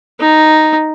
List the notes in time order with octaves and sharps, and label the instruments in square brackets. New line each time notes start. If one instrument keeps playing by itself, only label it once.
[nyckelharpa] D#4